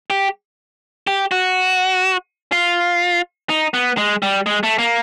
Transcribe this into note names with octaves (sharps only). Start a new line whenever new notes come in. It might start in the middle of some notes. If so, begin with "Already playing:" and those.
G4
G4
F#4
F4
D#4
B3
G#3
G3
G#3
A3
A#3